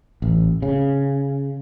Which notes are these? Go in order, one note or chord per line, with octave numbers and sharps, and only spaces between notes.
A1
C#3